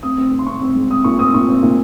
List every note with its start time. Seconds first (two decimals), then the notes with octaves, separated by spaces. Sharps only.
0.03 C4 D#6
0.18 C4
0.32 C4
0.39 C6
0.47 C4 C#6
0.62 C4
0.75 G#3
0.90 C4 D#6
1.04 A#2 C#6
1.19 C4 D#6
1.34 A#2 C#6
1.49 C4
1.63 A#2